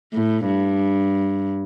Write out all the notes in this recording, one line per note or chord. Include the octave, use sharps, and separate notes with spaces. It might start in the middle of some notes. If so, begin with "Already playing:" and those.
A2
G2